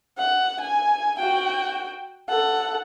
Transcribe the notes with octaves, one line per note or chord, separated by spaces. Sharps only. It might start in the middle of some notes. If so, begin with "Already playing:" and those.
F#5
G#5
F#4 G5
A4 F#5